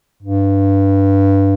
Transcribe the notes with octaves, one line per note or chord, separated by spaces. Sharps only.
G2